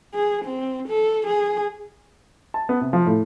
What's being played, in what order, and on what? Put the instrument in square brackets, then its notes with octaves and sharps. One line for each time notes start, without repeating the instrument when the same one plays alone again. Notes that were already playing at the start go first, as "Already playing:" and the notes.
[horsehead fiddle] G#4
C4
A4
G#4
[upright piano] A5
B3
C3
F3
A2